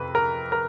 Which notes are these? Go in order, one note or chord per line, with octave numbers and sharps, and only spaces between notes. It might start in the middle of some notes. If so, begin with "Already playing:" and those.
Already playing: F2 C3 B4
A#4
A#4